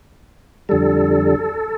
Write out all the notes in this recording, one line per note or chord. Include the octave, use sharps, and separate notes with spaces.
F2 D3 G3 A4